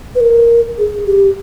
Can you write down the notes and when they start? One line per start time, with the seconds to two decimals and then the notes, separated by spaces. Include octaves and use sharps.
0.15 B4
0.20 A#4
0.78 G#4
1.06 G4